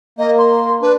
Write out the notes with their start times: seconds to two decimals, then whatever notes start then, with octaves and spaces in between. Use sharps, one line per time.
0.19 A#3 D#5
0.38 C6
0.82 D4 B4